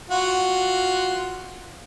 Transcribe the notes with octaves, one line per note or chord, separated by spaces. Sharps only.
F4 F#4